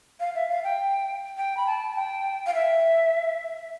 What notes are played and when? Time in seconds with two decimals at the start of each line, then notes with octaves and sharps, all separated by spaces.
0.20 F5
0.35 E5
0.49 F5
0.64 G5
1.37 G5
1.57 B5
1.67 A5
1.91 A5
1.96 G5
2.46 F5
2.55 E5